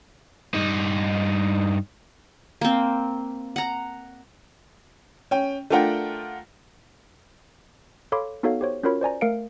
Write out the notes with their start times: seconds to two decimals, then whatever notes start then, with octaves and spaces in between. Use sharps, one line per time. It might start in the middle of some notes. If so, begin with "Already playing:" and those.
0.54 G2 D#4
2.61 A#3 C4
3.56 F#5 A#5
5.31 C#4 G5
5.70 A3 D4 F4 A#4 F#5 G5
8.12 A4 C#5 F5 B5 C6 D6
8.43 B3 D#4 F#4 A4 C#5 F5
8.61 G4 C5 C#5
8.83 C#4 F4 F#4 A#4 C#5 B5
9.01 C5 D5 G#5 A#5
9.21 A3 A#4 F5 C#7 D7